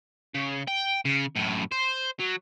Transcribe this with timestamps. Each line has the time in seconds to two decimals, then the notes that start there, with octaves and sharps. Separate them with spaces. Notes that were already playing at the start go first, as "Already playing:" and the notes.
0.34 C#3
0.67 G5
1.05 C#3
1.36 F#2 A2
1.72 C5
2.20 F#3